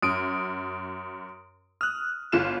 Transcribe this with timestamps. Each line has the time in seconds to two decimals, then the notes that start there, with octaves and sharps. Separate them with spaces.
0.02 F#2 D#6 D7
1.81 D#6 F6 F#6
2.32 G1 F4 E7